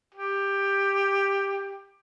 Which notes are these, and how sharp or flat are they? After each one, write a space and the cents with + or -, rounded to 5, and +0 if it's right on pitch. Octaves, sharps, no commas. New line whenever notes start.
G4 +10